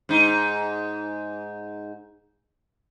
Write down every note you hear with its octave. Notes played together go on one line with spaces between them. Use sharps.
G#2 D#4